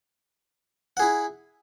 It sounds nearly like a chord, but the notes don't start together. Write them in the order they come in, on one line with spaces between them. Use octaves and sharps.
F#5 G#4 E4